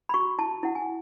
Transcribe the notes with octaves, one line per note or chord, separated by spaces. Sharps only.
B5
F#4 C#6
E4 A5
E4 F#5
G#5